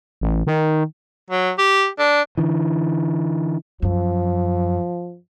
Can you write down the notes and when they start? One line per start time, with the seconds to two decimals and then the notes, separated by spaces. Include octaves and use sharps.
0.21 A1
0.47 D#3
1.30 F#3
1.59 G4
1.99 D4
2.37 D3 E3
3.82 F#2 F3